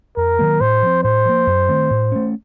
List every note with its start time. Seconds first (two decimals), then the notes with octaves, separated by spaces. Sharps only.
0.17 F2 A#4
0.39 D#3 F#3 A#3
0.60 A2 C5
0.83 F3 C4
1.04 A2 C5
1.25 F3 A#3
1.47 F#2
1.69 D#3 A3 C4
1.90 A2
2.12 A3 C#4